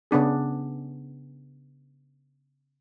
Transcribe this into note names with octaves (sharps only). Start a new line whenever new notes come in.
C#3 B3 D4 G#4